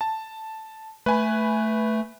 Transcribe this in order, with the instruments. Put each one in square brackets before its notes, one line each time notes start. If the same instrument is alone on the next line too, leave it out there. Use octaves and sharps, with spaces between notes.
[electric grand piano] A5
[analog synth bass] A3 [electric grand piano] B4 G#5 B5